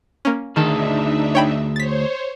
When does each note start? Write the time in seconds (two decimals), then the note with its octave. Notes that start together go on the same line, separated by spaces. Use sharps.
0.25 A#3 C#4
0.56 D2 D#3 D4 D#4 G#4 E5 A5
1.35 C#5 G5 B5
1.76 C5 C#5 A6 B6